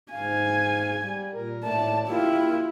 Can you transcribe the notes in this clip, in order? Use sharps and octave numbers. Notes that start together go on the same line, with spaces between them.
G#2 F5 G#5
G3
A#2 A#4
A2 A3 D5 A5
A#3 E4 F4 G4